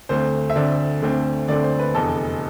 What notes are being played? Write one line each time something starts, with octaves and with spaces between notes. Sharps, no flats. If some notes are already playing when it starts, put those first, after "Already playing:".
D2 D3 A3 C4 C5
E5
D2 D3 A3 C4 D5
D2 D3 A3 C4
D2 D3 A3 C4 D5
C5
B4
F1 E2 D3 A4